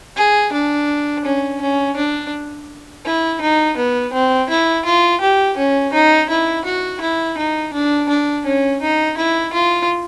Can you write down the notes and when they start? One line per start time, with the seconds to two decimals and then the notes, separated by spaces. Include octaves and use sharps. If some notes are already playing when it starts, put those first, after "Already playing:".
0.17 G#4
0.53 D4
1.25 C#4
1.61 C#4
1.96 D4
3.05 E4
3.41 D#4
3.77 B3
4.13 C4
4.49 E4
4.85 F4
5.20 G4
5.57 C#4
5.93 D#4
6.29 E4
6.65 F#4
7.01 E4
7.37 D#4
7.73 D4
8.09 D4
8.45 C#4
8.81 D#4
9.17 E4
9.53 F4